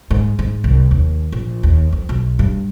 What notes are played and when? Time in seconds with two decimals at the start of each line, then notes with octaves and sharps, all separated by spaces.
0.11 G#2
0.39 G#2
0.64 C2
0.91 D#2
1.32 A#1
1.63 D#2
1.92 F2
2.09 B1
2.39 G2